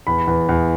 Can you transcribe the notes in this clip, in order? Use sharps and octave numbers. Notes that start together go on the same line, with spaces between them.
E2 B5
E2
E2